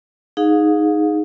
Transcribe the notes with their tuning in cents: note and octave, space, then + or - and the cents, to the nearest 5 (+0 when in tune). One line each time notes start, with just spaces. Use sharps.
D#4 +0 G#4 +0 F5 +35